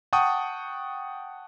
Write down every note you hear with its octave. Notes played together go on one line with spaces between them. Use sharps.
F#5 G5 A5 C#6 D#6